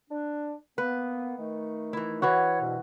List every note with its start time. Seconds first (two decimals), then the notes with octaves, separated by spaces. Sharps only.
0.10 D4
0.78 A#3 B3 B4
1.38 D#3 A3
1.93 E3 E4
2.22 E3 E4 F#4 B4 C#5
2.61 C2 G2 B2